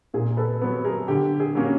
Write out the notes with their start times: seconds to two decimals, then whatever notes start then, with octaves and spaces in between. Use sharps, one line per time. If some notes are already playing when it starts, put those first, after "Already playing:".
0.14 A#2 G#4 A#4
0.37 A4 B4
0.62 F#3 B3
0.84 G#4 A#4
1.08 D3 G4
1.40 G#4
1.55 F#3 A#3 C#4